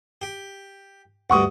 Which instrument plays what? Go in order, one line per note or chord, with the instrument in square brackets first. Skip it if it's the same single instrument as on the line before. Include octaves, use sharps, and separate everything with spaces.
[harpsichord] G4
[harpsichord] D2 G2 [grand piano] F#5 C#6 D#6